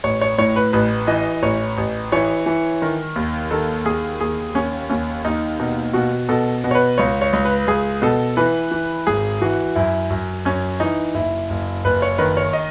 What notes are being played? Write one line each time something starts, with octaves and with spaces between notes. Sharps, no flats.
A1 C#5
C#5
A2 C#5
B4
A1 B4
E3 D#5
A1 C#5
A1
E3 C#5
E3
D#3
D#2
D#3 A4
D#2 G#4
D#2 G#4
D#2 C#4
D#2 C#4
D#2 D#4
B2 D#4
B2 F#4
B2 A4
B2
C#5
B4
C#2 C#5
C#5
C#2
B4
C#2 G#4
B2 A4
E3 B4
E3
G#1 G#4
E3 F#4
F#2 E4
F#2
F#2 C#4
E3 D#4
F#1 E4
F#1
F#1 B4
C#5
D#3 B4
C#5
D#5